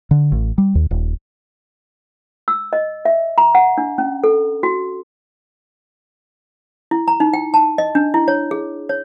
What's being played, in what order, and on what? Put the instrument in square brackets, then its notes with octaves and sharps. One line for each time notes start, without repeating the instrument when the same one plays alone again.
[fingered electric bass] D3
A1
G3
D#2
D#1
[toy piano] E6
D#5
E5
A#5
F#5
D4
C#4
A4
F#4
E4
A#5
D#4
G5
A5
D#5
D4
E4
C#5
G#4
C#5